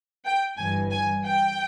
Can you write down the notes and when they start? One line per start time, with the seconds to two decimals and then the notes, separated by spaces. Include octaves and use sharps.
0.25 G5
0.58 G1 G2 E3 G#5
0.91 G#5
1.24 G5